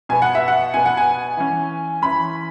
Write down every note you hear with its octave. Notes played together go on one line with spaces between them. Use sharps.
B2 B3 G#5
F#5
E5
F#5
B2 B3 G#5
F#5
G#5
E3 C#4
E3 C#4 B5